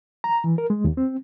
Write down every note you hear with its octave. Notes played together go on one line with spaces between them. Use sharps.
A#5
E3
A#4
G#3
D#2
C4